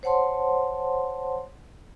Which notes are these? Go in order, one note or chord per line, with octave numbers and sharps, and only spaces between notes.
C5 C#5 F#5 A5 C6